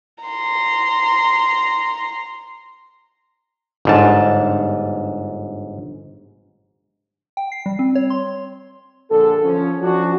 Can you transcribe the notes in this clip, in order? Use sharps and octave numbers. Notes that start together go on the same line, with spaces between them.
A#5 C6
G1 G#2 A5
G5
C7
G3
C4
C#5
C6
A#1 D3 G#4 A4
F3 C#4
F3 C#4 D4 F#4